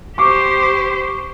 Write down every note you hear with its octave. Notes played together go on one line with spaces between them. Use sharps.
G4 C5 C#6 D6